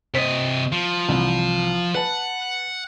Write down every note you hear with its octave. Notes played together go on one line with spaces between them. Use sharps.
C3 C5 D#5 B6
F3
C2 E3
B4 F#5 A5